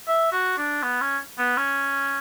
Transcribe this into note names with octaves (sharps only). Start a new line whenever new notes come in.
E5
F#4
D4
B3
C#4
B3
C#4